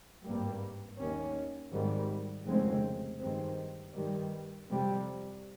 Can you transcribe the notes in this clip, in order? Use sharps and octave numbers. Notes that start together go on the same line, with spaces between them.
G#1 G2 G3 A#3
D#2 D#3 A#3 C#4
G#1 G#2 D#3 G3
F1 D#2 C#3 G#3 C4
G2 D#3 G#3 C4
G2 D#3 G3
F2 C3 G3